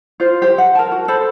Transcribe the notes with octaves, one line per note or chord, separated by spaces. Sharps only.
F4 C5
G4 C5
F#5
A#4 A5
F#4
A4 C5 B5